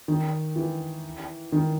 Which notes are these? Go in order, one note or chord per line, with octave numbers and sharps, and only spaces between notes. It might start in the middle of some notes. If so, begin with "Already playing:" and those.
D#3
E3
D#3